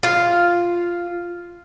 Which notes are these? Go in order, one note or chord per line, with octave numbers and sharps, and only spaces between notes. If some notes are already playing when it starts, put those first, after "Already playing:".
F4 F5